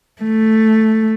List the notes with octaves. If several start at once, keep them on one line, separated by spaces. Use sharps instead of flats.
A3